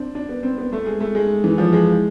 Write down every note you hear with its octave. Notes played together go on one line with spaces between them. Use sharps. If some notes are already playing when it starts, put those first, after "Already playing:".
Already playing: C4 D4
D4
B3
C4
B3
A3
G#3
A3
G#3
E3
F3
G#3